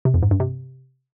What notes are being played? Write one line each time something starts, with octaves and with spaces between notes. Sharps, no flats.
C3
F2
G#2
G2
C3